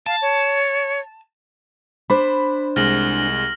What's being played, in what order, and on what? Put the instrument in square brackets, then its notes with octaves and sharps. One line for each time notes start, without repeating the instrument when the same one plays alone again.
[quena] F5 [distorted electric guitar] A5
[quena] C#5
[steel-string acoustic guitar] D4 C5 [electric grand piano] B5
[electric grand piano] C2 G#3 [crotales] F6 A#6 F#7